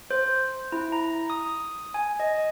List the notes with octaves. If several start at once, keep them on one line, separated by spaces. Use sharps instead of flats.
C5
E4
A#5
D#6
G#5
D#5